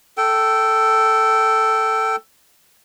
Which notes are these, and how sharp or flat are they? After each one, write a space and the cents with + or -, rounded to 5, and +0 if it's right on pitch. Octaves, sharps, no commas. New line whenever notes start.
A4 +5 G5 -20